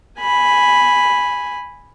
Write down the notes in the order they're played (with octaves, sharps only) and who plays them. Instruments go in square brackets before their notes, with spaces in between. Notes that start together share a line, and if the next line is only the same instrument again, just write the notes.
[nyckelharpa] G#5 B5